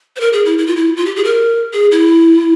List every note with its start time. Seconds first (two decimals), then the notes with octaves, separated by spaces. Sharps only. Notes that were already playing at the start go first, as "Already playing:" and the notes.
0.16 C5
0.20 A#4
0.33 G#4
0.45 E4
0.58 E4
0.67 F4
0.76 E4
0.97 F4
1.06 G4
1.16 G#4
1.24 A#4
1.73 G#4
1.92 E4